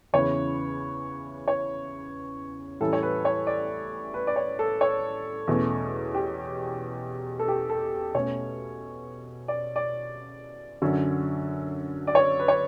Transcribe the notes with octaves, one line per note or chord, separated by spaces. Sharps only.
E2 C#3 E3 B3 C#5
C#5
A2 E3 G3 C#4 A4
C#5
B4
C#5
D5
B4
D5
C#5
A4
C#5
E2 B2 A3 C#4
G4
A4
G4
A4
B2 A3 C#4 C#5
D5
D5
F#2 D3 F#3 C#4
D5
C#5
B4
C#5